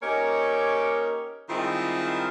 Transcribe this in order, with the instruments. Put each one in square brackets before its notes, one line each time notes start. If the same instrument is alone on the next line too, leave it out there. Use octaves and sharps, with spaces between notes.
[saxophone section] A#3 C#4 D#4 G4 A#4 C#5
D#3 G3 G#3 C4 E4 F4